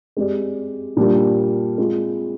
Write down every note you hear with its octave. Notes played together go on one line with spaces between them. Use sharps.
G#3 C4 G4 D5
A#2 G3 A#3 D4
G#3 C4 F4